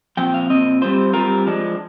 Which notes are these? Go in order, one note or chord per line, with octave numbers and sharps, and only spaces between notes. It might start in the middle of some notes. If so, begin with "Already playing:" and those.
A#2 F3 C4 G5
F5
A#2 F3 C4 D#5
G3 C4 F4 C5
G3 C4 F4 A#4
F3 G#3 D4